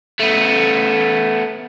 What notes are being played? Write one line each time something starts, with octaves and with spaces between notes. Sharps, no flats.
A3 B3